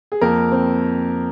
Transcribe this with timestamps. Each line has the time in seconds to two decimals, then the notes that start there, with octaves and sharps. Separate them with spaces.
0.12 G#4
0.21 F2 A#3 A#4
0.52 C4